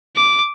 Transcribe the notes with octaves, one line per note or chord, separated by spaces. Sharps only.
D6